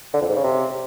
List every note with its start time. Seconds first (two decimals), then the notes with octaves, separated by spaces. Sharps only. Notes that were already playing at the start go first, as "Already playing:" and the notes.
0.14 D3
0.21 F2
0.29 G#2
0.36 C#3
0.44 C3